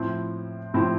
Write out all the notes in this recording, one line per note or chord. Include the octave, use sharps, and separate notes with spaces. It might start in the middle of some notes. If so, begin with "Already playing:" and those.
Already playing: A2 F3 C4 E4
A2 F3 C4 E4